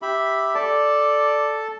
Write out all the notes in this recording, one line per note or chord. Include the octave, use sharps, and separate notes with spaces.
G4 E5 B5
A4 D5 A5